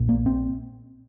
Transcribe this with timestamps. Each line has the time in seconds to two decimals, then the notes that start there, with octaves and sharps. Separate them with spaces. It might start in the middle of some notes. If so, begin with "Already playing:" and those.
Already playing: A#1 A#2
0.09 A#3
0.26 C4